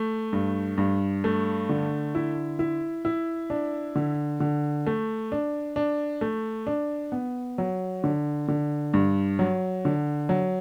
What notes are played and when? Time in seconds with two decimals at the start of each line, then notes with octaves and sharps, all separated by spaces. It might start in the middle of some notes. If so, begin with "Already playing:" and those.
Already playing: A3
0.33 G2
0.78 G2
1.24 A3
1.69 D3
2.15 E4
2.59 E4
3.05 E4
3.50 D4
3.95 D3
4.40 D3
4.87 A3
5.32 D4
5.76 D4
6.21 A3
6.67 D4
7.12 B3
7.58 F#3
8.04 D3
8.48 D3
8.94 G2
9.39 F#3
9.85 D3
10.29 F#3